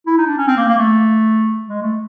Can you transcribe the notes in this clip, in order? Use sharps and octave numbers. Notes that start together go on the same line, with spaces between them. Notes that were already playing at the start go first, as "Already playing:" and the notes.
E4
D#4
D4
C#4
C4
A#3
A#3
A3
G#3
A3